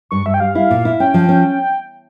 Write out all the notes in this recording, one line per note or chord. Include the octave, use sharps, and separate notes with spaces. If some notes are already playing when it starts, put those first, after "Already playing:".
G2 C#6
G2 E5
G5
G3 F5
E4
A#2
E4
C#4 G5
F3
C#4